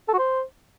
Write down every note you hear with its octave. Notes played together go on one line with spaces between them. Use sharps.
A4
F#4
C5